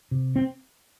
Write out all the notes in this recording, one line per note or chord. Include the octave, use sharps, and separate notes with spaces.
C3
C4